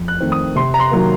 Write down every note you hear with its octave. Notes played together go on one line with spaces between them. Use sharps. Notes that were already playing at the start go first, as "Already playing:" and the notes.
Already playing: F2
F#6
D#3 A3 C4
D#6
C3 C6
A#5
C6
D#3 F#3 A#3